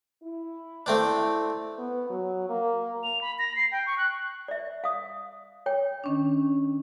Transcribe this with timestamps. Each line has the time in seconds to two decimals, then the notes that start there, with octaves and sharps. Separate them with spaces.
0.22 E4
0.86 A3 C4 D4
1.78 B3
2.10 F#3
2.50 A#3
3.04 F7
3.21 B5
3.39 A#6
3.56 C7
3.72 G5
3.87 C#6
3.98 F#6
4.48 D5 E5
4.84 F5 D#6
5.66 C#5 G5
6.04 D#3 C#4 D4